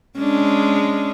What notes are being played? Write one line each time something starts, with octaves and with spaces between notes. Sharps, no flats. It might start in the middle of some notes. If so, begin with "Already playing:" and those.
G#3 C#4 D4